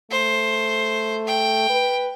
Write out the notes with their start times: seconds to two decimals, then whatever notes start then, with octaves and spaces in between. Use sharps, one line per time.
0.11 A3 C5
1.27 G5
1.70 B4